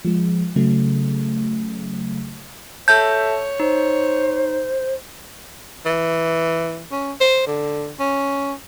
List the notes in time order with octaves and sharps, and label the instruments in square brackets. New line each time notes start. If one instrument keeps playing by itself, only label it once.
[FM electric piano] F3 G#3
C#3 F#3 A3
[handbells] A4 E5 A5 [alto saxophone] C#5 [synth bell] G6
[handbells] D#4 [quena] C5
[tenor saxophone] E3
C#4
C5
D3
C#4